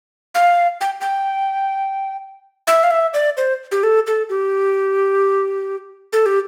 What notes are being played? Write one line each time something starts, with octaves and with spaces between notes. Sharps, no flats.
F5
G5
G5
E5
F5
E5
D5
C5
G4
A4
A4
G4
A4
G4